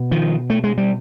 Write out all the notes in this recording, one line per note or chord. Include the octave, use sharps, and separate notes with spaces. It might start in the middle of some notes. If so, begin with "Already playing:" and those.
Already playing: B2
D#3 F3
A3
G#3
G3